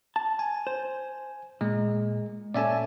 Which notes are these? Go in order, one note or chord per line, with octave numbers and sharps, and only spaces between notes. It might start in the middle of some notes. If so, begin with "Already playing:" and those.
A5
G#5
C5
A#2 G#3
A#2 C#4 A4 D5 E5 G#5